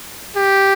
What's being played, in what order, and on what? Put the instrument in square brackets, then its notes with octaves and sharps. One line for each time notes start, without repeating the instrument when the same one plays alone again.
[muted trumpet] G4